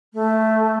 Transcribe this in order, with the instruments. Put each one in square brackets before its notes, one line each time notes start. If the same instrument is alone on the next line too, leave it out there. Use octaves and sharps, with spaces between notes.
[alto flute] A3